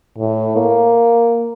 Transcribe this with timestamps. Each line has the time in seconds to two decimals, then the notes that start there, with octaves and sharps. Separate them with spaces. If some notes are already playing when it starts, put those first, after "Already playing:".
0.18 A2
0.56 A#3